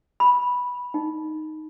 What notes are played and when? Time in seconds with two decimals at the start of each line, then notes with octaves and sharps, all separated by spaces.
0.20 B5
0.94 D#4